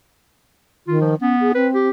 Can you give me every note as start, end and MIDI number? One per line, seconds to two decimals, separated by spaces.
0.87 1.15 51
0.87 0.97 65
1.01 1.14 53
1.21 1.53 59
1.21 1.35 61
1.40 1.52 68
1.55 1.89 60
1.55 1.67 71
1.74 1.90 67